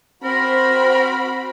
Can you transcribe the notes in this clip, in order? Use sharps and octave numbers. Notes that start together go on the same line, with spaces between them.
C4 F#4 A#4 C5 B5